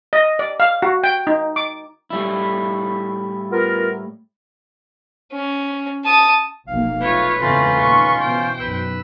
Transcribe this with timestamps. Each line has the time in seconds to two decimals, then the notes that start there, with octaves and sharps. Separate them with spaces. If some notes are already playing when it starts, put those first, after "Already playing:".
0.13 D#5
0.39 D5
0.60 F5
0.82 F#4
1.04 G5
1.27 D#4
1.56 D6
2.10 A2 G3 E4
3.51 B3 F4 A#4
5.32 C#4
6.04 A5 D#6
6.67 F1 B1 A#3 F5
7.01 A3 F4 B4 C#5
7.41 E2 G#2 C#3 A3 C4 C#4 F4 C6
7.80 A#2 D#3 C#6
8.21 B2 E3 C5 G5
8.59 B1 F#2 B4 E6 F#6